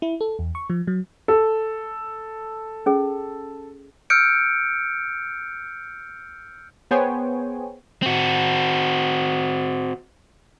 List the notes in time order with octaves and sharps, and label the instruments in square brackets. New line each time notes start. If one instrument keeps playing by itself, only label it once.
[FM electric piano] E4
A4
E2
C#6
F3
F#3
[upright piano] A4
[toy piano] C#4 G#4
[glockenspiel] E6 F6 G6 C#7 D7
[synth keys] B3 G#4 C5 C#5 G5 G#5
[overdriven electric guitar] C4 F#4